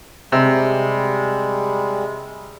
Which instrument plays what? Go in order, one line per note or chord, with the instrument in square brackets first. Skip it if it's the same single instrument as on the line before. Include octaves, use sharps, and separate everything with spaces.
[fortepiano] C3 [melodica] G3 G#3